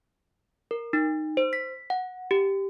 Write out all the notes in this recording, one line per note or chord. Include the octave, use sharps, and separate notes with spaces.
A#4
D#4
C5
B6
F#5
G4